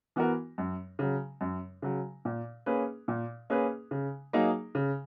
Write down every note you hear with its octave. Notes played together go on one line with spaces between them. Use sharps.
E3 B3 F#4 A#4
F#2
C#3 F#3
F#2
C#3 F#3
A#2
A#3 C#4 G#4 B4
A#2
A#3 C#4 G#4 B4
C#3
F#3 A#3 D#4 G#4
C#3